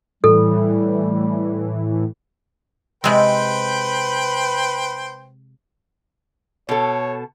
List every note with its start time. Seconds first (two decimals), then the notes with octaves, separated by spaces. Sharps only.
0.24 A2 E3 G3 A4
3.04 C3 G#3 C4 B4 C5 G5
6.69 B2 A4 C#5